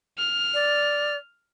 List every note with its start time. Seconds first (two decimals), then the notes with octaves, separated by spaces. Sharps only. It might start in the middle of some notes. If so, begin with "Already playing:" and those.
0.18 F6
0.54 D5